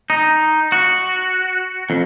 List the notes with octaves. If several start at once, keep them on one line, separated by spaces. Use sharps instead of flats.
D#4
F#4
F2